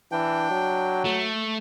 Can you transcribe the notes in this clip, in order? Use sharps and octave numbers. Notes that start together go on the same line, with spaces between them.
E3 D4 G5
F#3
A3